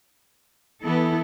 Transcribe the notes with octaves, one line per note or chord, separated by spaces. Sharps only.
E3 B3 E4 A4